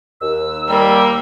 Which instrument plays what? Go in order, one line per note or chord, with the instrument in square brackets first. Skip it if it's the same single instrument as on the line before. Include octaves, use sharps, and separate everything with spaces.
[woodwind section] D#2 [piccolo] E6
[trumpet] G3 [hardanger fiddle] A#3